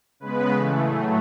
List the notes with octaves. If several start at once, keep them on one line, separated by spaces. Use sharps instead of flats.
C#3 G#3 B3 B4
C#3 E3 A3
A2 F#3 A3 G#4